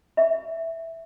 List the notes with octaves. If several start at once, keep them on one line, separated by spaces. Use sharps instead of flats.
E5